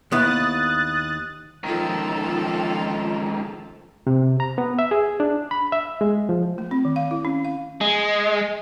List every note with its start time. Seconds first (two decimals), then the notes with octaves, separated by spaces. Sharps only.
0.12 D#2 B3 E4 D#6 F#6 A6
1.64 C#2 D#3 F3 F4 A4
4.07 C3
4.40 A#5
4.58 B3
4.79 E5
4.91 G#4
5.20 D4
5.51 B5
5.72 E5
6.01 G#3
6.29 F3
6.58 A3
6.71 C4
6.85 D#3
6.96 F5
7.11 E4
7.25 C#4
7.45 F5
7.81 G#3